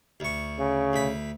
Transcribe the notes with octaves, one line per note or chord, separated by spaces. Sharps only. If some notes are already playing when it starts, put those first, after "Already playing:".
D2 C#6
C#3
D2 B5